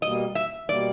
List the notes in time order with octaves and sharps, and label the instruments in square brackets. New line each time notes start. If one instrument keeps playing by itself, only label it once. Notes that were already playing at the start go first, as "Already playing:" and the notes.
[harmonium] B2 G3 A#3 [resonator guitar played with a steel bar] D#5
[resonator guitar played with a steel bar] E5
[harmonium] B2 G3 A#3 [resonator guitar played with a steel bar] D5